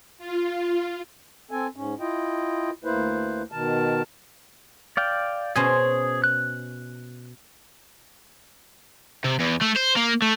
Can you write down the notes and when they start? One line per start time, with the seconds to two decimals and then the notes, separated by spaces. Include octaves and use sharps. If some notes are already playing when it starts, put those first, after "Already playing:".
0.18 F4
1.51 C4 A4 G#5
1.76 G#2 C#4
2.00 E4 F4 D#5 G5
2.84 D2 A#3 E4 B4 C5
3.52 B2 D#3 A#4 A5
4.97 D5 F5 G5
5.56 B2 C#4 G#4 C5
6.24 F#6
9.24 C3
9.40 E2
9.62 A3
9.77 C5
9.96 A#3
10.22 A3